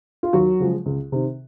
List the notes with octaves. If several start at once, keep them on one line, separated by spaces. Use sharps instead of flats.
F4
D#2 F#3 F#4
C#3 F3 G#3
C#2
C3 D#3